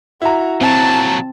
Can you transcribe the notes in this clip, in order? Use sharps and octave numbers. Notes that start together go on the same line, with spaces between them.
E4 F#4 A#5
A#2 F#3 C4 A5